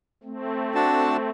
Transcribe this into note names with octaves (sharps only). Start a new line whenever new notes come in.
A3 C4
D4 F#4 A5